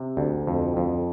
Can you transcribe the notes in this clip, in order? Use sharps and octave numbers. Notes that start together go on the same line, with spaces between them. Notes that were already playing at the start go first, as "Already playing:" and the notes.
Already playing: C3
D2
F2
F2